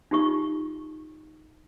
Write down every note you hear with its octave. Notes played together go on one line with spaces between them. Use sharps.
D#4 F4 G4 C#6